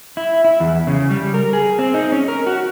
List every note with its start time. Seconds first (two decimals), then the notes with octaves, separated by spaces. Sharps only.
0.17 E4
0.44 E4
0.60 E2
0.87 C#3
1.10 G3
1.34 A#4
1.53 G#4
1.79 C4
1.94 D#4
2.12 C#4
2.28 A#4
2.47 F#4